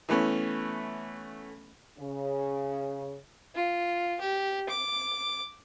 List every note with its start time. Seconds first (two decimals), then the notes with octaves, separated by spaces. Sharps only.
0.09 E3 A3 B3 C#4
1.98 C#3
3.54 F4
4.20 G4
4.69 D6